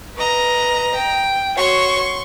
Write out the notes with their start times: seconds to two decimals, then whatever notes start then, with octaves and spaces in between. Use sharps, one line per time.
0.16 B4 D#5 A#5
0.95 G5
1.57 F#4 C#5 C6 C#6